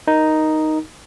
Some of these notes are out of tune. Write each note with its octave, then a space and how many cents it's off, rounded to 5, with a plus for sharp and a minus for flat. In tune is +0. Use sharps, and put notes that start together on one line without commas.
D#4 +0 A#4 +5